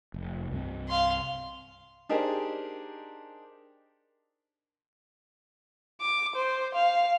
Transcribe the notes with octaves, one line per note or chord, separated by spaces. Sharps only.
F1
C2 G2 C4
F5 C6
D4 D#4 G4 G#4 A#4 C5
D6
C5
F5